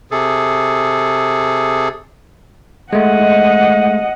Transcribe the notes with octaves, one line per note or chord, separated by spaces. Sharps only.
C3 G#4 A4
G#3 A3 D#5 F#5